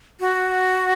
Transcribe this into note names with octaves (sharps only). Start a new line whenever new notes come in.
F#4